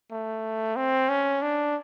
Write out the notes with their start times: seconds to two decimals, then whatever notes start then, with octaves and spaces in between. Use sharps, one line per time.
0.11 A3
0.76 C4
1.09 C#4
1.42 D4